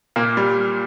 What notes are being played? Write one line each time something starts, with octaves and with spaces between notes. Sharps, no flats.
A#2 A#3
G3